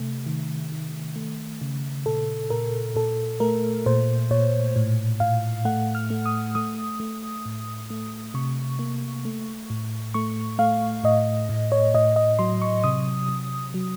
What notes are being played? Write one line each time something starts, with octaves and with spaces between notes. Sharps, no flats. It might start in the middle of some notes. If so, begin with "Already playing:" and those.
Already playing: C3 A3
D#3
D#3
A3
C#3
A#2 A4
A#2 A#4
A#2 A4
A3 A#4
A#2 C5
A#2 C#5
A2
A2 F5
A3 F#5
F6
A3
D#6
A3 D#6
A3
A2
A3
C3 C#6
A#3
A3
A2
A3 C#6
A3 F5
A2 D#5
A2
C#5
A2 D#5
D#5
F#3 C6
C#6
C3 D#6
C3
F#3